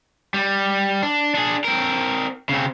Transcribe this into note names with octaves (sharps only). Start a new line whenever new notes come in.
G3
D4
D4 G#4
C4 A#4
C#3 C4